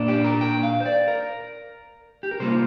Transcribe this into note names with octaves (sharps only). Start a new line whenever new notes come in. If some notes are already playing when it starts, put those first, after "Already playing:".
Already playing: A#2 A#3 D4
G4
A#4
G5
F5
C5
D5
A#4
G4
A#4
C3 G3 A#3 F4 C5